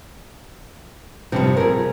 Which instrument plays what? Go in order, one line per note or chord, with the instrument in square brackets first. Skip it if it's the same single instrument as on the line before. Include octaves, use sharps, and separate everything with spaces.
[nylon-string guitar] G2 C3 [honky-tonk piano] F3 G3 C#7
[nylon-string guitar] G#4 A#4